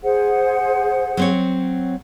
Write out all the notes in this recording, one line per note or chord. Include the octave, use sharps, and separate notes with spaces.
G#4 C5 F#5
F#3 C4 C#5